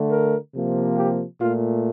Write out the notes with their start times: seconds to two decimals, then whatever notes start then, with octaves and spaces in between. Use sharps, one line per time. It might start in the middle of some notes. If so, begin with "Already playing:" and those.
Already playing: D3 A3
0.10 A#4
0.53 C3 F3 A#3
0.96 G4
1.39 A#2 A3 F4